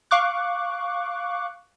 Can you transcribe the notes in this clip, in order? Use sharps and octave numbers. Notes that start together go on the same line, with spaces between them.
F5 C#6 D6 F#6